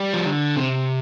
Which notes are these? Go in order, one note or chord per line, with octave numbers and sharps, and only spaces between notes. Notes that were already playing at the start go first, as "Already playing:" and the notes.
Already playing: G3
F3
D3
C3